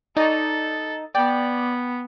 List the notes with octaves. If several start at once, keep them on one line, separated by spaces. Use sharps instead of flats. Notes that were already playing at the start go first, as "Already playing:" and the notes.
D#4 A4 D5 C#6
B3 D5 G5